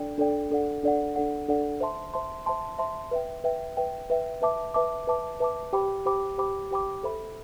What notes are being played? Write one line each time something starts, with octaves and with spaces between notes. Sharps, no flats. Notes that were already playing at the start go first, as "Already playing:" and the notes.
Already playing: D4 A4 D5 G5
D4 A4 D5 G5
D4 A4 D5 F#5
D4 A4 D5 F#5
D4 A4 D5 F#5
D4 A4 D5 F#5
C5 E5 A5 C6
C5 E5 A5 C6
C5 E5 A5 C6
C5 E5 A5 C6
B4 E5 G5
B4 E5 G5
B4 E5 G5
B4 E5 G5
B4 E5 A5 D6
B4 E5 A5 D6
B4 E5 A5 D6
B4 E5 A5 D6
G4 C5 G5 B5 D6
G4 C5 G5 B5 D6
G4 C5 G5 B5 D6
G4 C5 G5 B5 D6
A4 C5 E5 B5